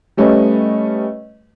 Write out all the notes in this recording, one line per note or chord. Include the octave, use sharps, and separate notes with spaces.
G3 A3 C#4 B4 C#5 D#5